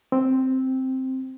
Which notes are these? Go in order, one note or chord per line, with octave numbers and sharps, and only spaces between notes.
C4